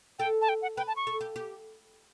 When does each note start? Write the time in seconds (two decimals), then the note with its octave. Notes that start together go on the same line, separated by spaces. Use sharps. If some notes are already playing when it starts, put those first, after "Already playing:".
0.19 A4 G5
0.41 A5
0.49 G5
0.62 F#5
0.77 B4 G5
0.88 A5
0.96 C#6
1.07 A4
1.21 G4
1.36 G4